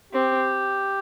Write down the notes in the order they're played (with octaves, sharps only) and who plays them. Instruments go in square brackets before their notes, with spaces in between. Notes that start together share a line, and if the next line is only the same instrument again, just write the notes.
[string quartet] C4 [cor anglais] G4